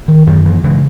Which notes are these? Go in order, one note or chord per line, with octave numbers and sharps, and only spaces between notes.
D#3
F#2 D#3
E3
C#3 E3 G#3